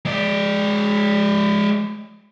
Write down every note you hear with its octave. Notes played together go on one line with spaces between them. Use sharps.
G#3 D5